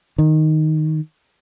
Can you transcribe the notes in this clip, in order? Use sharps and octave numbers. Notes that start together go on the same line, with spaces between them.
D#3